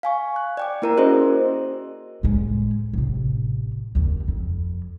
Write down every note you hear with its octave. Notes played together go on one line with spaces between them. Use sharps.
F5 G#5 C#6
F#6
D5 G5 D6
A#3 E4 A#4 D5 A#5
C#4 F#4 G#4 A#4 C5 D#5
A2 G#3
A1 C3
F#1 D#2
F2